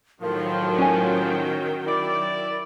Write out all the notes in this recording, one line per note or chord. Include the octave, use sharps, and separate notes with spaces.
A2 D#3 F3 F#3 A#4 G5
C#4 F#4 G#5
E4 D5